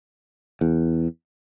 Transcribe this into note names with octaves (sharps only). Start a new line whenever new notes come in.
E2